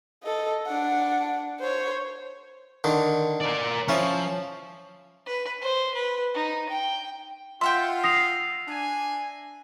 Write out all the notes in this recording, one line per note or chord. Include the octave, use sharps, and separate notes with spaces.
A4 D#5
D4 F#5
C5 C#5
D3 D#3
A#4 D5
F3 C#4 E4
B4
C5
B4
D#4
G5
F4 E5 F#5 G5 C6
D#6 A#6 C7 F7
D4 G#5